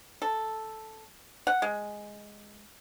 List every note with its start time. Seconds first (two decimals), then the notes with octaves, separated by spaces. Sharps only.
0.22 A4
1.47 F#5
1.62 G#3